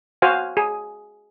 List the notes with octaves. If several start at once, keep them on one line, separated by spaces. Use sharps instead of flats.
F#4 C5 F5 G#5
G#4